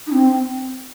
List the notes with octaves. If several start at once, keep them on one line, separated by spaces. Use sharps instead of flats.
D#4
C4